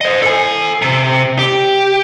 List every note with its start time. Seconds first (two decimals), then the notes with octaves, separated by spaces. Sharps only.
0.01 C5 D#5
0.22 A4 G#5
0.82 C3
1.39 G4